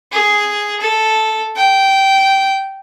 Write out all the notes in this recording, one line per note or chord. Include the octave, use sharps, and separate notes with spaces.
G#4
A4
G5